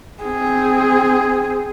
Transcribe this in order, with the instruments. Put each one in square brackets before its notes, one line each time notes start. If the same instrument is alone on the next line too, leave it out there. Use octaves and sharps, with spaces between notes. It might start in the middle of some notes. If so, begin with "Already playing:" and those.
[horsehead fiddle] C4 G#4